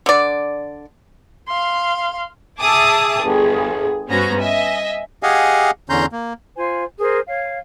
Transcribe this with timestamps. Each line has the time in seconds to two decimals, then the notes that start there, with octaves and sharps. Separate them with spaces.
0.06 D3 D5
1.49 F5 C6
2.60 G#4 E5 A5 D6 D#6
3.23 G1 G#4
4.10 G2 B3 C#4 F#4 C5 A#5
4.41 D#5 E5 G#5
5.23 G4 G#4 D#5 F5 F#5 G#5
5.90 E2 D3 C#4 A#5 C6 G6
6.12 A#3
6.56 F4 C5 G#5
6.99 G#4 A#4 C5
7.26 C#5 F5